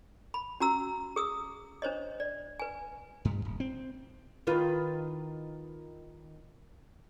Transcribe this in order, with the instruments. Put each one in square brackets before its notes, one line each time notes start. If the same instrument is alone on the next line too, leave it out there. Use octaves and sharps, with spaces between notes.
[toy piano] B5
C#4 F#4 A#5 E6
G#4 D#6 E6
D4 C5 C#5 D#5
D5
B4 G#5
[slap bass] G2
D#1
C4
[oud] D#3 F4 B4